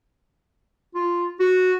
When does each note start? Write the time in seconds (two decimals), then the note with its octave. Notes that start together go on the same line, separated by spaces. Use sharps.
0.95 F4
1.40 F#4